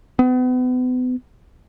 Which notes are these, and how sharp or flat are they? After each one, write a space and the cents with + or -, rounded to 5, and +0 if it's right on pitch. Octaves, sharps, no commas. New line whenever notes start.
B3 +35